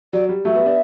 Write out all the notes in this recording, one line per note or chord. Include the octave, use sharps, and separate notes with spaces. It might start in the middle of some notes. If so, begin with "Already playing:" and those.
F#3 D5
G3
F#3 A3 E5
G3 B3
B3 D4